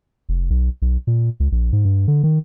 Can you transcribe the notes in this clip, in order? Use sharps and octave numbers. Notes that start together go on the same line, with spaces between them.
F1
B1
B1
A#2
C#2
A#1
G#2
G2
D3
D#3